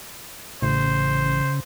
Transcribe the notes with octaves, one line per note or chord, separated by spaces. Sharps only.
A1 C#3 C5